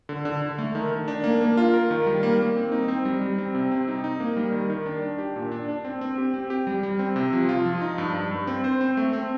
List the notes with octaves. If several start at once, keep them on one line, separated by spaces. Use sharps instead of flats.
D3
D3
D3
A3
D#3
D#3
D4
A#3
A#3
F4
A#4
D#3
G3
A#3
A#3
C4
D#4
C4
G3
G3
C4
C3
C4
D#4
D#4
A#3
G3
D#3
D#3
D4
D4
G4
A#2
D4
D4
C4
C4
G4
C4
G4
G3
G3
C4
C3
F3
F4
F3
D#4
G2
G2
G2
C4
C5
C4
A3
C4